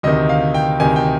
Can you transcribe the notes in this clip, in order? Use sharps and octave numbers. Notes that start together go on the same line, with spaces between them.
D2 C3 D#3 D#5
F5
G5
D2 C3 D#3 G#5
G5